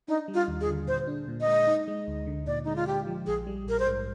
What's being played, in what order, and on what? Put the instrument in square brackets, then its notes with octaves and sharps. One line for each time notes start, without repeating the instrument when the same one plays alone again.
[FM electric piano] D4 [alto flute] D#4
[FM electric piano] G3
[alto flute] F4
[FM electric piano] D#2
[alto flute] G#4
[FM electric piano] D3
[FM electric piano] A#2 [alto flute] C5
[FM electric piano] D4
A#2
[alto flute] D#5
[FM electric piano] G#3
D#4
G#3
D2
D3
[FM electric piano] A#2 [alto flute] D5
[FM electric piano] G#3 [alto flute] D#4
[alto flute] F4
[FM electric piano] A#2 [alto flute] G4
[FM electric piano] F3
[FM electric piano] A#1 [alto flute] G#4
[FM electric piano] G3
[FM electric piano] A#1 [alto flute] A#4
[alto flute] C5
[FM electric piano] G#2